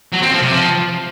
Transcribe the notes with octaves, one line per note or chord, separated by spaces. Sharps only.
F#3
C4
F3
C3
F3